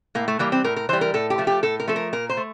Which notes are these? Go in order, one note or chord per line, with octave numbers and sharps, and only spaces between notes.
A2 A#3
A3
E3 G3 A#3
C4
A2 A#4
A#4
E3 G3 C5
A#4
A2 A4
G4
F3 A3
G4
A2 A4
A#4
F3 A3 A4
A#4
A#2 A#4
C5
A3